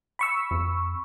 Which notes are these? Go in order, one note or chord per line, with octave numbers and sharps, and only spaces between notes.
B5 C#6 E6
F2